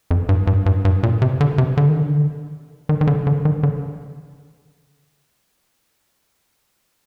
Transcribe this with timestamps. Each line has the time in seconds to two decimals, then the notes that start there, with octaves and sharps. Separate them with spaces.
0.11 F2
0.29 G2
0.47 G2
0.66 G2
0.85 G2
1.03 A#2
1.22 C3
1.41 D3
1.58 C3
1.77 D3
1.90 D#3
2.01 D3
2.89 D#3
3.01 D#3
3.07 D3
3.27 D3
3.45 D#3
3.63 D3